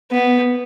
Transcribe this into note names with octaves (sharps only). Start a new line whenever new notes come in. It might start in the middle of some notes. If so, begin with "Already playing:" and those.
B3